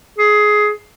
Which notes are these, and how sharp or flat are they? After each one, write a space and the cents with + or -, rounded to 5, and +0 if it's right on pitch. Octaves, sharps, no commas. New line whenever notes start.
G#4 +15